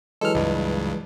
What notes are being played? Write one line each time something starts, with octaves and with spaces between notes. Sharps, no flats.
E3 F#3 G#3 A4 F6
C#2 G2